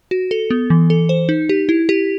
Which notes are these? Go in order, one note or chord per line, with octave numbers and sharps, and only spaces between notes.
F#4
A4
B3
E3
A4
C5
D#4
G4
E4
G4